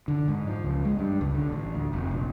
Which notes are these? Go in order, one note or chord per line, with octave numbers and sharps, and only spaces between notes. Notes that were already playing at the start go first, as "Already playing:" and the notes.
D3
G#2
F3
C#2
G#3
G2
C#2
D3
A1
D2
F1
A#1